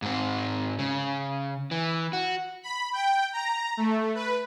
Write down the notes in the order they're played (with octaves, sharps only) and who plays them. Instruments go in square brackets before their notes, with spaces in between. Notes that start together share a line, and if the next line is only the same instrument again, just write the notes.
[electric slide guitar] G#2 C4
C#3
E3
F#4
[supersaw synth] B5
G5
A#5
A3
B4